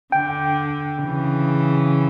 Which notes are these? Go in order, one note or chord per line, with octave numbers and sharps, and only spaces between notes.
D3 G5
C#3 E3